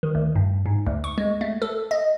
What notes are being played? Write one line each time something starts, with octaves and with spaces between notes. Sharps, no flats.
D#3
D2
G2
G#2
D2
C#6
G#3
A3
A4
D#5